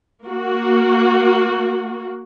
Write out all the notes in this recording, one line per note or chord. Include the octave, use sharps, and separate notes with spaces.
A#3 F#4